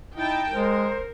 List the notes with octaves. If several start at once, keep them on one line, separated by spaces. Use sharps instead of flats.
D#4 E4 G5 A5
G#3 A#4 C5